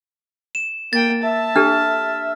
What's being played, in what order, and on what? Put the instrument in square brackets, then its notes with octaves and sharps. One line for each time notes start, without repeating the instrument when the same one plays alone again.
[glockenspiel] E7
[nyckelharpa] A#3 G5 [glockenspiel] A6
[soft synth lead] E5 [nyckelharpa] A5
[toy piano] D4 G4 A4 [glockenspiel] F6